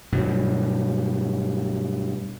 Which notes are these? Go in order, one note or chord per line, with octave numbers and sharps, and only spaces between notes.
G2 B2 F#3